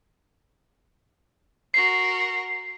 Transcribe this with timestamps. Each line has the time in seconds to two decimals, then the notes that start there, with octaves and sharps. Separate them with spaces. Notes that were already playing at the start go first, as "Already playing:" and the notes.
1.74 F#4 A#4 C7